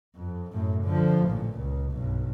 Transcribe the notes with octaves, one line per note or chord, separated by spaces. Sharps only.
F2
F#2 A2
D3 F3
A1 A#2
C#2
B1 G2